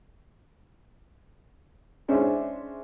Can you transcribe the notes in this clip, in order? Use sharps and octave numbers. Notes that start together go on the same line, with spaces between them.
G#3 C#4 D4 C5 E5